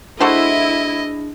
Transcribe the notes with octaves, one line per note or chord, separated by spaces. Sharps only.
A3 D4 E4 F#4 G#4 C5 D#5 A5